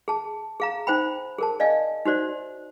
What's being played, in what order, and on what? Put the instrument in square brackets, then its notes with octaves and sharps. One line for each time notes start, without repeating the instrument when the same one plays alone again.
[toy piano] G#4 A5
G#4 F5 A#5
D#4 C5 G5 B5
G#4 A#4 A5
D5 D#5 F5 G#5
D#4 F#4 C5 D5